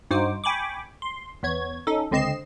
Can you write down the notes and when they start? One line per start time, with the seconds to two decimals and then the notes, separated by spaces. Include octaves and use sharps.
0.11 G2 D#4 F#4 C5 D6
0.44 G5 G#5 B5 C#6 D6
1.02 C6
1.43 E2 B3 C#5 G#6
1.87 C#4 D#4 A4
2.11 C#2 D3 C4 D#5 C7 E7